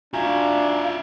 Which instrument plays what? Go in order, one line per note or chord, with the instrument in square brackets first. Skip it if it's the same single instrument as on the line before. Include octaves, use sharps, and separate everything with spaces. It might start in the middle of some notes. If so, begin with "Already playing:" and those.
[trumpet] D4 [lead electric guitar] F4 E5 [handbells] F#4 G#5 A#5 [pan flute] F5